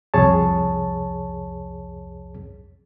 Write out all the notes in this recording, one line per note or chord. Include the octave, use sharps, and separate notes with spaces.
C2 F2 G#4 C#5 A5